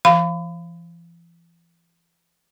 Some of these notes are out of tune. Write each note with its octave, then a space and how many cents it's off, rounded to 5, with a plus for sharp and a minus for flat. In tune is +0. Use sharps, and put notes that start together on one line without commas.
E3 +45 F5 -15 B5 +35